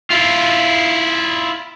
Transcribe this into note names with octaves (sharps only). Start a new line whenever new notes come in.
E4 F4